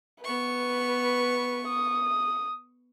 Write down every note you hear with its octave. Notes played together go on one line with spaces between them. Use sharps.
B3 B4 C#6
D#6